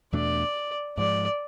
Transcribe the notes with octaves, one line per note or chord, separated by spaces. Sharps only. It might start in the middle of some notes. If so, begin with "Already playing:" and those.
E2 B2 A3 D4 D5
G#2 F3 G#3 D5